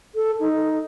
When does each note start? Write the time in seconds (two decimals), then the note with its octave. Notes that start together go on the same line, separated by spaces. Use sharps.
0.15 A4
0.40 D#4